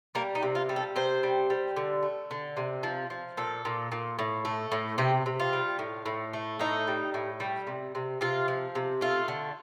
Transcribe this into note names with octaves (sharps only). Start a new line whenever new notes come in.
G3 A#3
D#4
C3
F4
G3
A4
C3 C5
G3
G3
D3
A3
D3
C3
F3
F3
A#2 A4
A#2
A#2
A2
A3
A2
C3 G4
C3
F4
G3
A2
A2
A3
A2 D#4
G3
A2
G3
C3
C3
C3 F4
F3
C3
A3 F4
D3